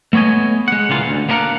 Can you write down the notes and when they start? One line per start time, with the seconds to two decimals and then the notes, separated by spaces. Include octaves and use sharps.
0.13 A3 B3 C#5 D#5 G#5
0.68 G#3 F#5
0.89 C#2 A#2 E3 F4
1.06 D2
1.29 A#3 B3 D4 A#4 F5 F#5